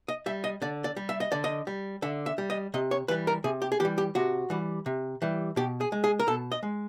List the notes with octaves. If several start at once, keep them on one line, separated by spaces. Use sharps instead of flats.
D#5
G3 E5
D#5
D3 D5
D5
G3
E5
D#5
D3 D5
D#5
G3
D3 E5
E5
G3
D#5
C3 D#5
C#5
E3 G3 B4
A#4
C3 G#4
G4
G#4
E3 G3 G4
G4
C3 F#4
E3 G3
C3
E3 G3
B2 G4
G#4
G#3
G#4
A#4
B2 A4
D#5
G#3